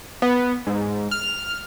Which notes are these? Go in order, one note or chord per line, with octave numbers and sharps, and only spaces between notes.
B3
G#2
F6